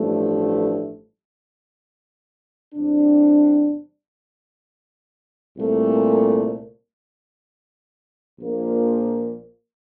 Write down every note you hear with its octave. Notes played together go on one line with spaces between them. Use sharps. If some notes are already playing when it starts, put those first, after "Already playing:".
Already playing: A1 G2 F3 A3
E2 C3 G3 D4
C2 A#2 A3
A#1 A#2 F3 A#3 F4